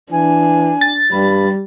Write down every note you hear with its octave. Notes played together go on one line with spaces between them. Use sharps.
E3 D4 G#5
A6
G2 G3 B5